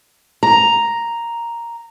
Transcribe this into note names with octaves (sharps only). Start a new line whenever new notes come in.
A#5